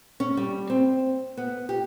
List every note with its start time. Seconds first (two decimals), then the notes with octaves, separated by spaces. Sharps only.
0.20 C#4
0.37 G3
0.70 C4
1.37 B3
1.69 G4